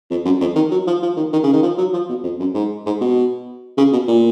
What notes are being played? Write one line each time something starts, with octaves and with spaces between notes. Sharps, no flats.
F2
F#2
F2
D#3
F#3
F3
F3
D#3
D#3
C#3
D#3
F3
F#3
F3
B2
F2
F#2
G#2
G#2
B2
C#3
B2
A#2